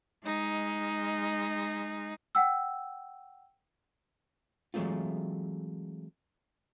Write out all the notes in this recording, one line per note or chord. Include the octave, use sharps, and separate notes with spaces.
G#3 D#4
F#5 G5 E6
E3 F#3 G#3 A3 C4 F4